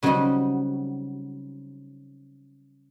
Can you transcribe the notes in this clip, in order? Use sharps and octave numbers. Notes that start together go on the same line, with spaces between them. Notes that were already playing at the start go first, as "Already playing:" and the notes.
C#3 F#3 G3 C4 D#4 F#4